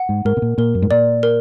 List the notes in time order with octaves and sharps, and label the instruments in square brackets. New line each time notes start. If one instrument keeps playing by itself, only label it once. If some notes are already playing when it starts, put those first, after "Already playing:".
Already playing: [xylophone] F#5
[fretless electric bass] G#2
[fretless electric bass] G#2 [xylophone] A#4
[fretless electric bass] B2
A#2
[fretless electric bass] A#2 [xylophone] A#4
[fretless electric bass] F#2
G#2
[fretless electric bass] A#2 [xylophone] D5
[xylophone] A#4